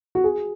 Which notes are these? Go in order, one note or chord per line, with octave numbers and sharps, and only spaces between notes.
F#4
G#4